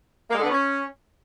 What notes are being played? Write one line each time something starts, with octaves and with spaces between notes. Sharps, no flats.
A#3
G#3
D3
B3
C#4